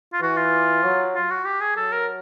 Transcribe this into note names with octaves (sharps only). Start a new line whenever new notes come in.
F4
E3 F#4
F4
F#3
F4
F#4
G4
G#4
F#3 A4
A#4